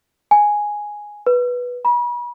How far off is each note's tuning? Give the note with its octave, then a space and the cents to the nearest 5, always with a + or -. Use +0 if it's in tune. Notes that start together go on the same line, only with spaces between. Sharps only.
G#5 +0
B4 -10
B5 -40